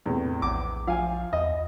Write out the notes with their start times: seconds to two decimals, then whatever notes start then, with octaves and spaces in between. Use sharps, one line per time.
0.06 E2 A2 C3
0.42 A#1 D6
0.87 F3 F5 G#5
1.33 E2 D#5